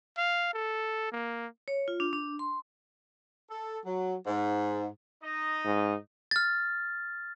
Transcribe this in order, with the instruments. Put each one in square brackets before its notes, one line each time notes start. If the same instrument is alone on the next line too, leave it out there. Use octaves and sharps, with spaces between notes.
[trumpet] F5
A4
A#3
[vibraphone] C#5
F4
D4
D4
C6
[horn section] A4
F#3
G#2
[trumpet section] D#4 D#5
[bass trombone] G#2
[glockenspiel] F6 A6